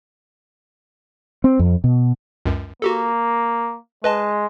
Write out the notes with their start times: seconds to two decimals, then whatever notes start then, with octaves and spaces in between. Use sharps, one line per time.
1.44 C4
1.59 F2
1.84 B2
2.46 C#2 F#2
2.82 A#3 F#4 G4 A4
4.04 G#3 B4 D#5 A5